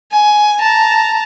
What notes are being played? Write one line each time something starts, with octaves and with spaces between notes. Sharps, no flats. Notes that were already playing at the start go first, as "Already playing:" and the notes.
G#5
A5 A#5